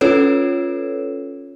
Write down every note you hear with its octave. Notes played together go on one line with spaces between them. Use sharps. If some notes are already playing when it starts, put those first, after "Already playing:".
C#4 F4 A4 B4 C#5